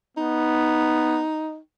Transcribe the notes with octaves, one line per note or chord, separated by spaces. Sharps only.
B3 D#4